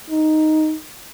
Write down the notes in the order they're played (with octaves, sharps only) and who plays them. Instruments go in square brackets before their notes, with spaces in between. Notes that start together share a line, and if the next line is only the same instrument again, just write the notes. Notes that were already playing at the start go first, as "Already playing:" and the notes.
[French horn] D#4